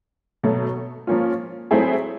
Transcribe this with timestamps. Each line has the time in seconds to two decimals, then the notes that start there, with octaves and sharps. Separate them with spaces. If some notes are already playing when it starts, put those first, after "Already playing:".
0.43 B2 F#3 A3
1.07 F3 A#3 C#4 F4
1.71 F#3 A3 C4 E4 G#4